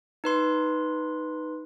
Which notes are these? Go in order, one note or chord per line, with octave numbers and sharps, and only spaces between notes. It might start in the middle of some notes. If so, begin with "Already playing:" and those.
D#4 B4 C6